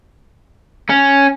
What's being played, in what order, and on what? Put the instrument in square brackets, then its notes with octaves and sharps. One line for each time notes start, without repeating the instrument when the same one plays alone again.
[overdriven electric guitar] C#4